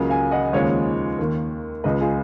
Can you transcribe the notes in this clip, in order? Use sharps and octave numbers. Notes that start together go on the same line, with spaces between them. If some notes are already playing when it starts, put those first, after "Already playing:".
Already playing: C#2 C#3 F#3 A#3
F5 G#5
D#5 F#5
D#2 C#3 F3 G#3 C#5 F5
D#2 D#3 A#3
C#2 C#3 G#3 B4 D#5
F4 G#4